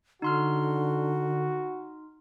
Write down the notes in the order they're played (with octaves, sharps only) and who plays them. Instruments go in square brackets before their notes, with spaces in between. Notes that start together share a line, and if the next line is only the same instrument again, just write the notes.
[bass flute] D3 [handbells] D#4 C6 F6 [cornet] F#4